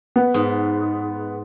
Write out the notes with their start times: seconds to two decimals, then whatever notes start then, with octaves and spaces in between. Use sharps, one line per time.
0.16 B3
0.34 G#2